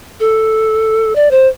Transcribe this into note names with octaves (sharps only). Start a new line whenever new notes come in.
A4
D5
C5